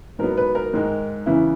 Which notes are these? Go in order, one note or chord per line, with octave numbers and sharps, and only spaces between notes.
G#2 F#3 B3 A#4
B4
A#4
G#2 D#3 G#3
E2 C#3 E3 B3 E4